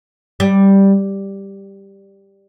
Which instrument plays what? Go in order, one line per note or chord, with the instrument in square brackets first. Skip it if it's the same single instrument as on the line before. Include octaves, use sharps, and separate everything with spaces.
[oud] G3